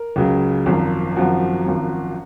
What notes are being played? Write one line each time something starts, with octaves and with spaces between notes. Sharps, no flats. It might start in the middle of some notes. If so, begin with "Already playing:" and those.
Already playing: A#4
C#2 C#3 F#3
G#1 F#2 F3
G#1 F#2 F3 F#4
G#1 F#2 F3